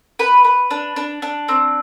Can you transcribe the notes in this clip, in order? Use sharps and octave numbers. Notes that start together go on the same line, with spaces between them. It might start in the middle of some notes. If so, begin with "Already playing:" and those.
B4
B4
D4
D4
D4
C4